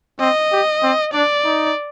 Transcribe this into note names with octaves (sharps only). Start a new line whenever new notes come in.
C4 D#5
G4
C4
D4 D5
D#4